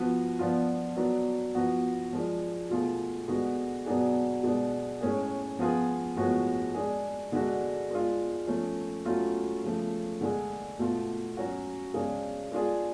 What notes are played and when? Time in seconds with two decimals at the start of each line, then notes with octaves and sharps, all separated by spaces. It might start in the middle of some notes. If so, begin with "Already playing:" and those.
Already playing: F3 B3 F#4
0.39 F3 B3 D4 F4
0.97 F#3 B3 D4
1.55 F3 B3 F#4
2.13 F3 G#3 D4
2.70 B2 A3 F4 G#4
3.28 D3 G#3 B3 F#4
3.86 B2 F#3 B3 D4 G#4
4.43 B2 G#3 D4
5.01 A2 G#3 C#4 G#4
5.59 F3 B3 F4 G#4
6.17 A2 F3 G#3 B3 F#4
6.74 G#3 D4 G#4
7.32 D3 G#3 D4 F#4
7.91 G#3 D4 F4
8.47 F3 A3 C#4
9.06 F#3 A3 C#4 F4
9.64 C#3 F3 A3
10.21 D3 G#3 D4 G#4
10.79 B2 A3 F4
11.37 F#3 C#4 F#4
11.94 C#3 G#3 D4 G#4
12.52 G#3 D4 F4 G#4